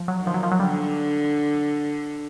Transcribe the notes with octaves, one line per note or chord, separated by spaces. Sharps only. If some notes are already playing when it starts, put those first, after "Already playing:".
Already playing: F3
F#3
D#3
F3
F#3
F3
F#3
D3 G3